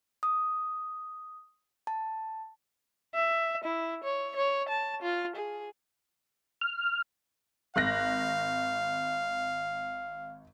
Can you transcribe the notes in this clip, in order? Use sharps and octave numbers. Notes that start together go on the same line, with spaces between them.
D#6
A5
E5
E4
C#5
C#5
A5
F4
G#4
F6
G#1 F5 F#6 A#6